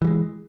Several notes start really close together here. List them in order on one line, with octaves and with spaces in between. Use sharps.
E3 G3 G#3